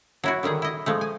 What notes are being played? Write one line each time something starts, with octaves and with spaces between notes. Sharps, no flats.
F#3 E4 F#4
D3 D#3 G3 G#4
E4 D#5
F3 G#3 A3
G#5